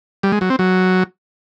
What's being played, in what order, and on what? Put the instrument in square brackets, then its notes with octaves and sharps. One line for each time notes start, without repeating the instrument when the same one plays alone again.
[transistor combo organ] G3
G#3
F#3
C4
F#3